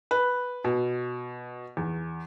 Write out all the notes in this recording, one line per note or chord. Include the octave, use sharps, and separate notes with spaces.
B4
B2
E2